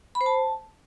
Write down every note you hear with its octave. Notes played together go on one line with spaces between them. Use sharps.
B5
C5
A5